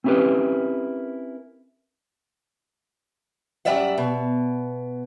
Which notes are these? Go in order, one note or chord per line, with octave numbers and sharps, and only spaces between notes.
C4 C#4 E4 G4 A#4 B4
F#2 G3 D5 E5 F#5
B2